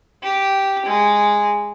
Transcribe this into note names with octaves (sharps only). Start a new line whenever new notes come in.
G4
G#3